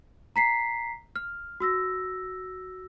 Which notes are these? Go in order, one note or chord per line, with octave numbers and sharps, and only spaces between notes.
A#5 B6 C7
F6
F#4 E6 A#6